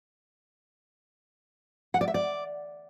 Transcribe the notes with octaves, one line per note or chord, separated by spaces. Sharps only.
F#5
D5
E5
D5